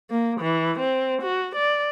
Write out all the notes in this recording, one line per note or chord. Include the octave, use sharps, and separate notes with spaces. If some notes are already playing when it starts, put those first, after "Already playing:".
A#3
E3
C4
F#4
D5